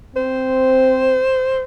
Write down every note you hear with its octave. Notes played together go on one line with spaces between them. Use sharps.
C4 C5